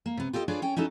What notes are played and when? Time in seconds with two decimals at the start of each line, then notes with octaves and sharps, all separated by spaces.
0.06 A#3
0.17 C3 B3
0.33 F4 G4 A4 D5 D#5
0.48 D4 F4 G#4 B4 C#5 D5
0.62 C#4 C#5 G5
0.76 C#4 D#4 E4 F#4 A4